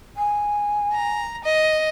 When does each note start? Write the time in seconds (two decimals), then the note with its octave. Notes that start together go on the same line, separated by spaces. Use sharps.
0.16 G#5
0.93 A#5
1.44 D#5